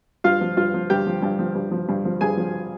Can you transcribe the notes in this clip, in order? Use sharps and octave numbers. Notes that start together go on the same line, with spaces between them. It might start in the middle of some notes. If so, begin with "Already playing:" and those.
G2 F4 F5
F3
G2 F4 F5
F3
G2 G4 G5
F3
G2
F3
G2
F3
G2
F3
G2 G#4 G#5
F3